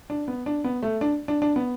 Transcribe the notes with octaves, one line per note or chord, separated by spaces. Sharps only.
D4
B3
D4
B3
A3
D4
D4
D4
B3